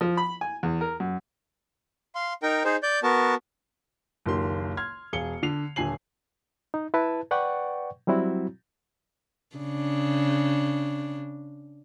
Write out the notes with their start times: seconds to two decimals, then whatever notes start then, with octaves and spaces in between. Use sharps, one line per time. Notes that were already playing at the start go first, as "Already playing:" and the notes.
0.01 F3
0.17 B5
0.41 G#5
0.63 E2
0.81 A#4
1.00 F#2
2.15 F5 C6
2.43 D#4 A#4 G5
2.65 D#4 G#4 C5
2.83 D5 G6
3.03 B3 F#4 A#4 A5
4.26 F#1 C#2 D#3 A#3 G4 C6
4.77 C6 F6 G#6
5.13 E1 G#4 F5 C#7 G7
5.43 D3 C7 F7
5.76 D#1 D3 G#5 C7 F#7
6.74 D#4
6.94 E4 B4 A5
7.31 B4 D5 F#5 G5 C#6
8.07 F#3 G3 C4 E4 F#4
9.56 C#3 D4